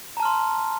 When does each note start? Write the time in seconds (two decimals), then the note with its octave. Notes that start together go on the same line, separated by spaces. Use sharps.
0.17 A#5
0.20 A5
0.23 F6
0.25 C6